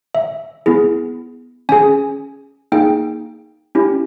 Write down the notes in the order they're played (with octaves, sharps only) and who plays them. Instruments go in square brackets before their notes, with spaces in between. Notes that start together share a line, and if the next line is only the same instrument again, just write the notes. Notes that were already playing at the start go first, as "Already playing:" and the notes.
[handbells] E5
B3 E4 G#4
C#4 G#4 G#5
A#3 D#4 G#4 G5
C#4 E4 G4